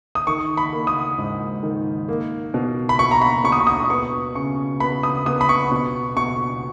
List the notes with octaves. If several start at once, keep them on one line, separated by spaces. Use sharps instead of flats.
D#6
D#3 C#6
B5
A#3
D#6
G#2
D#3
A#3
B2
B5
B2 C#6
A#5
B5
B2 C#6
D#6
C#6
D#6
B3 C#6
C#3 C#6
B3 B5
D#6
B3 D#6
B5
C#6
B2
B2 C#6